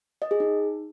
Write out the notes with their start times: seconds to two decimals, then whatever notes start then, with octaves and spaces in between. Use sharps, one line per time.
0.22 D#5
0.31 G#4
0.40 D#4